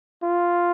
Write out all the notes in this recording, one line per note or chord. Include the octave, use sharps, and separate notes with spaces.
F4